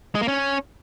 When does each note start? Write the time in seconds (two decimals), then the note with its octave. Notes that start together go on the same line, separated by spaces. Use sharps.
0.15 G#3
0.21 A#3
0.28 C#4